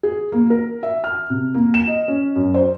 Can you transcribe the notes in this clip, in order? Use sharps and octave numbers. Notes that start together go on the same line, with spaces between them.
G#4
A#3
A#4
E5
F6
C3
A#3
E7
D#5
C#4
F#2
C5